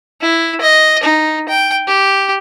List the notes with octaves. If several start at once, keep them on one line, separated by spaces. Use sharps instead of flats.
E4
D#5
D#4
G5
G4